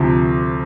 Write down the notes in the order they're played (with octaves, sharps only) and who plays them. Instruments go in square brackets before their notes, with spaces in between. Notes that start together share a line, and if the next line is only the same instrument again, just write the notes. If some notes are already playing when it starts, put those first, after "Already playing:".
Already playing: [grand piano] D2 C3 F3